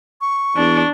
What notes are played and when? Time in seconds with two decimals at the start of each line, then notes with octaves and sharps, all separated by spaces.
0.21 C#6
0.57 E2 D4